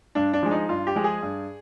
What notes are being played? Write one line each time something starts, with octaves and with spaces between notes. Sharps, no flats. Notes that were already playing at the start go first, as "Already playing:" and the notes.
G2 D4
D4
F3 G#3
D#4
G2 F4
G4
F3 G#3
G#4
G2